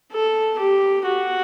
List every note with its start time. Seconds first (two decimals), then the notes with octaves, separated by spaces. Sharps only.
0.13 A4
0.59 G4
1.06 F#4